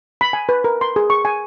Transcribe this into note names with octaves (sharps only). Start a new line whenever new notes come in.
B5
G#5
B4
A#4
C6
G#4
C#6
G#5